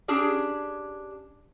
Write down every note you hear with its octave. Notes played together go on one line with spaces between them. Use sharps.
C#4 D4 G4 G#4